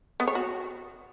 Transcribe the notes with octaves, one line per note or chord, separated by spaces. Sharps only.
B3
C#5
F#4